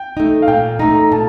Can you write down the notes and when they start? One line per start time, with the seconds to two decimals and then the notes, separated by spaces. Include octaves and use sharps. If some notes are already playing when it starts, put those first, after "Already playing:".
Already playing: G5
0.17 A3 D#4
0.42 F5
0.48 A#2 G5
0.79 A3 D#4 A#5
0.95 A#5
1.12 A#2 A5